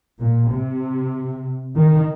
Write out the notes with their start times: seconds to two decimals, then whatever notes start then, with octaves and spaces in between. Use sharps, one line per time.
0.19 A#2
0.50 C3
1.76 D#3